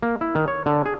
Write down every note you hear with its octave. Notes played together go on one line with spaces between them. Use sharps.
A#3
E4
D#3
C#5
D3
G#4